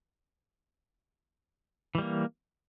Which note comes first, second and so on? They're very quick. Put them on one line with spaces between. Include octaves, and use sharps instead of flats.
E3 G3 A#3